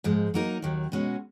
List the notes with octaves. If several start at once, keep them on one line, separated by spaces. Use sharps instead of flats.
G#2 F3 G#3
F#3 A#3 D#4 A#4
D#2 D#3 F#3
B2 G#3 C#4 F#4